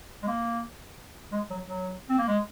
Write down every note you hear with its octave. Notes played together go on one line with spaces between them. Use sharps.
G#3
A#3
G#3
F#3
F#3
C4
A#3
G#3